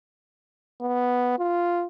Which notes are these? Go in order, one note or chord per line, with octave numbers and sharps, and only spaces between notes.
B3
F4